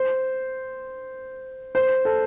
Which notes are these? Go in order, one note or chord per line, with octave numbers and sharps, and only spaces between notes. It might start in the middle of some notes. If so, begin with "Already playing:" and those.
Already playing: C5
C5
A4